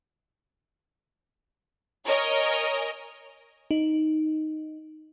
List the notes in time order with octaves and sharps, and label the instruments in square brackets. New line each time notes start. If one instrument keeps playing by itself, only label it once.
[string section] A#4 C#5 D#5 G#5
[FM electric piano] D#4